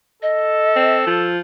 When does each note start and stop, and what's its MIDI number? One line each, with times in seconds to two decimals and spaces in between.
0.22 1.32 69
0.22 0.97 75
0.76 1.05 60
1.07 1.39 53